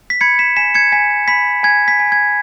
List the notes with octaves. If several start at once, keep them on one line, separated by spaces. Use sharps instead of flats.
B6
B5 G#6 C#7
B6 E7
G#5 B6 E7
G#6 C#7
G#5 B6
B5 B6
G#5 G#6
B6
G#5
G#6